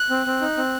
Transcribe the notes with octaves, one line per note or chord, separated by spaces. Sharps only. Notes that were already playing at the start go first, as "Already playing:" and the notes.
Already playing: F#6
C4
C4
D#4
C4